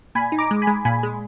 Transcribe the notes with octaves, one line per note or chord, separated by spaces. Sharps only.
A#2 G#5 B5
D#4
A#5 D6
G#3
G#5 B5
G#3
A#2 G#5 B5
G#3